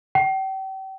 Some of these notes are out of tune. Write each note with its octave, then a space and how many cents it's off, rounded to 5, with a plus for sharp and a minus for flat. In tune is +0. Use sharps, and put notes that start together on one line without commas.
G5 -40